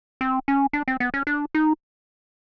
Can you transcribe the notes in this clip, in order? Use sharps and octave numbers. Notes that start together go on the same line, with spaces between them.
C4
C#4
D4
C4
B3
C#4
D4
D#4